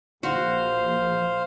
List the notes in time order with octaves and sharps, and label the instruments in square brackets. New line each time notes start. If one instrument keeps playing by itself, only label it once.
[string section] A#1 F3 A#3 [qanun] F#4 [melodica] C5 F5